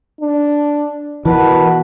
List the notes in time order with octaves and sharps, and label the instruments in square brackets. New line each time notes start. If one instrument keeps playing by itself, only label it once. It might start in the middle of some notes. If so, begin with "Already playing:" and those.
[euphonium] D4
[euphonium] B2 [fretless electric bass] E3 [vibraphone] A#4 F#5 A5 [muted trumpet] B4